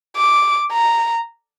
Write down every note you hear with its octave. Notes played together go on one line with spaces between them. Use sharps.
D6
A#5